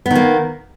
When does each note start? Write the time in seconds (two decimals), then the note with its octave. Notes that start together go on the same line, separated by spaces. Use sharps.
0.06 B3
0.11 D#3
0.15 A#3